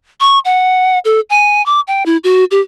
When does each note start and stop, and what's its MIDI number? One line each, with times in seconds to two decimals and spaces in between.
0.20 0.39 85
0.45 0.99 78
1.05 1.20 69
1.30 1.64 80
1.66 1.80 86
1.88 2.06 79
2.06 2.17 64
2.24 2.44 66
2.51 2.61 67